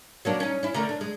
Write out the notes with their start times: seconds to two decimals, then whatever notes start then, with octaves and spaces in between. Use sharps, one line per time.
0.25 F#3 A#3 D4
0.40 C#4 D#4
0.63 C#4 E4
0.74 D3 A3 A#4
0.89 D4
1.01 G#3